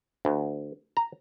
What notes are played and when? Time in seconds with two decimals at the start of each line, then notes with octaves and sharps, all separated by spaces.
0.25 D2
0.97 A#5